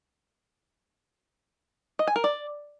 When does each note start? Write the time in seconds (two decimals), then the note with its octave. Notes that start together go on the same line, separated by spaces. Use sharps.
1.99 D#5
2.07 G#5
2.16 A#4
2.24 D5